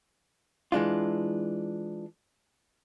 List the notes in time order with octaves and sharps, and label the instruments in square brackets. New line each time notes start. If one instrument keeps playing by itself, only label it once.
[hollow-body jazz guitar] E3 G#3 D4 F4